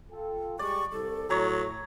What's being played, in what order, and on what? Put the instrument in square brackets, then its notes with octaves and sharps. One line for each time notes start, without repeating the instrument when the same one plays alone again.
[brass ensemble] F4 A4 G5
[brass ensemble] G3 G#3 [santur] D5 [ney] C#6
[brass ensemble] C2 [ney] A4
[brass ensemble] A2 [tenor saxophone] F#3 [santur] C#5 A#5